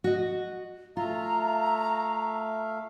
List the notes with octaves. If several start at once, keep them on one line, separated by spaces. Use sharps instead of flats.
F#4 D#5
A3 F4 E5 F5 A#5